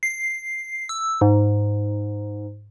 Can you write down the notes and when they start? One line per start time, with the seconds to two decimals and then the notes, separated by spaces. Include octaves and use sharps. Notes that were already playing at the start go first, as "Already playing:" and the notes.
0.03 C7
0.89 E6
1.21 G#2